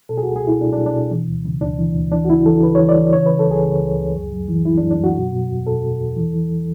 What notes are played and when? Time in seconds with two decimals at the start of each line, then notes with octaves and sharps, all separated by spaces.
0.09 B2 A4
0.18 G#4
0.23 C#2 F#4
0.36 G#4
0.44 B2 E4
0.60 B2 D4
0.72 D4
0.78 B2
0.86 D4
0.94 B2
1.11 E3
1.28 D2
1.45 C#3
1.61 D2 D4
1.78 E3
1.95 D2
2.12 E3 D4
2.25 F#4
2.29 C#3 E4
2.46 E3 A4
2.62 C#3 B4
2.75 E3 C#5
2.89 D5
2.97 E3
3.13 C#3 C#5
3.26 C#3 B4
3.39 A4
3.47 C#2 G#4
3.64 C#3
3.80 C#2
3.98 C#2
4.14 F#2
4.32 F#2
4.48 E3
4.65 F#2 E4
4.78 D4
4.82 F#2
4.90 D4
4.99 F#2 F#4
5.15 B2
5.33 B2
5.49 E2
5.67 B2 A4
5.83 B2
6.01 E2
6.16 E3
6.34 E3